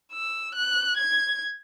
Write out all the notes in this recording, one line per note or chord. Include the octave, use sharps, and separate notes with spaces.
E6
F#6
G#6